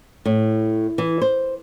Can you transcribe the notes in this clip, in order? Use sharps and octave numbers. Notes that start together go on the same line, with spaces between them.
A2
E3
C5